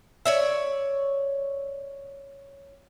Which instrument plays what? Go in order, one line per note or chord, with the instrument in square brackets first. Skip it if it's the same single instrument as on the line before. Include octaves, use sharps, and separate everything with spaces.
[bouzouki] C#5 D5 E5